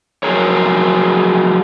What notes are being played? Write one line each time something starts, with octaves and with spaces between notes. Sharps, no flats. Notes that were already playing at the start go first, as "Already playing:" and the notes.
F3 F#3 F4 G#4 A#4 C#5